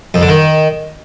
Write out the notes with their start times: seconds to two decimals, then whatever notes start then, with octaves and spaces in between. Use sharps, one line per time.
0.14 F2
0.21 D3
0.29 D#3